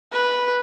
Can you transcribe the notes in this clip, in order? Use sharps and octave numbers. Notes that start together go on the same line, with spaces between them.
B4